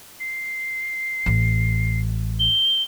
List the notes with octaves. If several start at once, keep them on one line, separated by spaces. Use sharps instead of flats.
C7
A1
G7